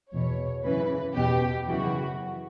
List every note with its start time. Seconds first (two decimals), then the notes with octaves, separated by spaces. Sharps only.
0.12 E2 B2 C#5
0.64 F#2 C#3 E3 B4
1.15 E2 B2 G4
1.68 F#2 C#3 E3 F#4